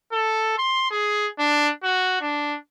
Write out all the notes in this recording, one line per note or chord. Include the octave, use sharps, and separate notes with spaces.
A4
C6
G#4
D4
F#4
D4